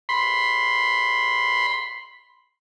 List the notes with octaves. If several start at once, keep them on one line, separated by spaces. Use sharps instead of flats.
B5 C6